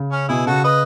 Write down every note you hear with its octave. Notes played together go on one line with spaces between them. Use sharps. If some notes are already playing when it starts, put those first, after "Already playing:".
Already playing: C#3
C#4
B2 E4 G#4
C#3 F#4 A4
B4 D#5